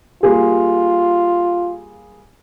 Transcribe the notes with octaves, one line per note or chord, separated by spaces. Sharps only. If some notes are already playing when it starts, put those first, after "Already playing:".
G3 A#3 F4 G#4